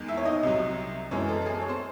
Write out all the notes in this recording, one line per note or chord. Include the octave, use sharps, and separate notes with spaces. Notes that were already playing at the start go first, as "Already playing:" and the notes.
Already playing: E2 D#3 G#3
E4 E5
C#5
D#4 D#5
C2 C3 F#3
F#2 E3 G#3 C#4 C#5
A4
A4
G#4
C#5
C4 C5